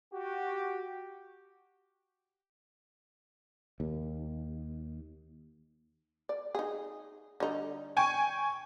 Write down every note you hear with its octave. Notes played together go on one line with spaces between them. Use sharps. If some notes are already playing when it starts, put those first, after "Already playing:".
F#4 G4
D#2
D5
D#4 G#4
D3 G3 D#4
G5 G#5 C#6